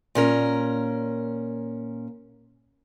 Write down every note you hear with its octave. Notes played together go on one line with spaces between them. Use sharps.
A#2 C#4 A#4